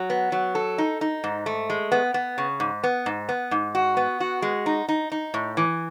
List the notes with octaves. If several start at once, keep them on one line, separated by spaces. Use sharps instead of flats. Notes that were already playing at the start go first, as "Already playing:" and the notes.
Already playing: F#3
B3
F#3
A4
D#4
D#4
G#2
A3
G#3
B3
B3
C#3
G#2
B3
G#2
B3
G#2
F#4
B3
F#4
G#3
D#4
D#4
D#4
A2
E3